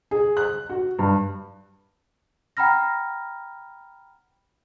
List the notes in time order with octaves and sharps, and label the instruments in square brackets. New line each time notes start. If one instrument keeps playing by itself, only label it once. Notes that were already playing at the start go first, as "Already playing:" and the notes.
[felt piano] G#4
F#6
F#4
G2
[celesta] F#5 G5 A#5 B5 F6 A#6